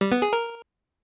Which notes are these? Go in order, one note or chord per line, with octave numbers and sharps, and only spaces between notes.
G3
B3
G#4
A#4